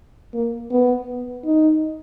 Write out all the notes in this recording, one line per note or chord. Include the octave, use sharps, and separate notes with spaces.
A#3
B3
D#4